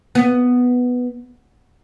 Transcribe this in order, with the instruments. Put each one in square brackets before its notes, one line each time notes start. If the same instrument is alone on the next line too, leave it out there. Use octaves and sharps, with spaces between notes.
[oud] B3